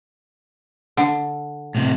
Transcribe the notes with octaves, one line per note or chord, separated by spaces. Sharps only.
D3
A2 C3